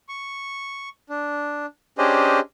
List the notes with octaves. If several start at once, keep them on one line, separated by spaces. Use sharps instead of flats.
C#6
D4
C#4 D4 G4 G#4 C5 D#5